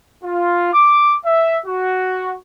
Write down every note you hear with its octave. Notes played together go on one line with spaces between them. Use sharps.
F4
D6
E5
F#4